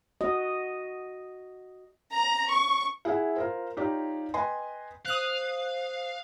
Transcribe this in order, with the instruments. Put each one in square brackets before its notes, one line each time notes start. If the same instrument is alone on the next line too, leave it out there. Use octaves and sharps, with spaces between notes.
[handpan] F#4 D#5
[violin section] A#5
C#6
[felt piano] E4 G#4 E5 F#5
F4 A#4 C5
D#4 F4 G4 C#5 D5
B4 D#5 G5 G#5 C6
[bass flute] C5 [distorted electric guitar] F5 [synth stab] D#6 F#6